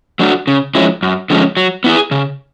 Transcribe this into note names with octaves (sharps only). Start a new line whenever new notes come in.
F#3 A3 D4 F#4
C#3
F3 G#3 C#4 E4
F#2
D3 F3 G#3 C#4
F#3
B3 E4 G#4
C#3